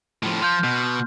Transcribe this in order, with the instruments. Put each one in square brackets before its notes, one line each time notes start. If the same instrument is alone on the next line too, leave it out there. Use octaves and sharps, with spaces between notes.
[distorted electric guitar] A2 F3
[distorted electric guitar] F3 [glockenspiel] C6 F6 G6
[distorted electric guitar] B2